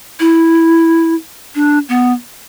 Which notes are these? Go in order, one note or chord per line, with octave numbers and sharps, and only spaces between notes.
E4
D4
B3